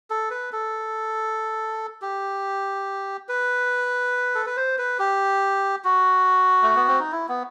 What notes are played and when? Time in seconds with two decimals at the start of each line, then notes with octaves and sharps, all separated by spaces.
0.10 A4
0.31 B4
0.52 A4
2.02 G4
3.29 B4
4.35 A4
4.46 B4
4.57 C5
4.78 B4
4.99 G4
5.84 F#4
6.62 A3
6.75 B3
6.88 C4
6.99 D#4
7.12 E4
7.29 B3